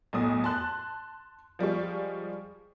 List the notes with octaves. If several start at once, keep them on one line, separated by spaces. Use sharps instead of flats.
B1 A2 D#6
A5 C6 F#6
F3 G3 G#3 C#6